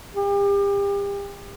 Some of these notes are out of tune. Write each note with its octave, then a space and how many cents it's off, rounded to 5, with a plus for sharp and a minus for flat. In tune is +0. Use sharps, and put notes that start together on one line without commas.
G4 +35